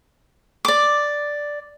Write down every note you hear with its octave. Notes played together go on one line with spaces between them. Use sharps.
D5 D6